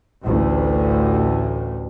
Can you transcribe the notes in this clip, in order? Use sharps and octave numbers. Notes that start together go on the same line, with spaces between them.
A1 D2 A2